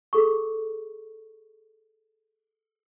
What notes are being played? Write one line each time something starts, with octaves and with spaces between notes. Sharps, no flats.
G#4 A4 C#6